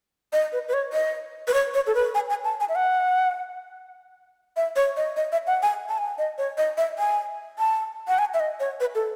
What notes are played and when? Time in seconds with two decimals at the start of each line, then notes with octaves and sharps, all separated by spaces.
0.33 D#5
0.53 B4
0.68 B4
0.73 C#5
0.93 D#5
1.48 B4
1.54 C#5
1.74 C#5
1.87 A4
1.95 B4
2.15 G#5
2.30 G#5
2.45 A5
2.60 G#5
2.69 E5
2.75 F#5
4.57 E5
4.76 C#5
4.97 D#5
5.17 D#5
5.32 E5
5.47 F#5
5.63 G#5
5.89 A5
5.98 G#5
6.18 D#5
6.38 C#5
6.58 D#5
6.77 E5
6.99 G#5
7.59 A5
8.08 F#5
8.19 G#5
8.34 E5
8.40 D#5
8.60 C#5
8.80 B4
8.95 A4